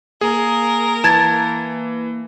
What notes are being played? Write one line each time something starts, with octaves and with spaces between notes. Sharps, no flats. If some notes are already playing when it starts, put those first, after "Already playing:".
A#3 G#4 A#4
E3 A5 G#6 A6